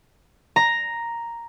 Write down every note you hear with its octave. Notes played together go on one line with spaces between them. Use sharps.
A#5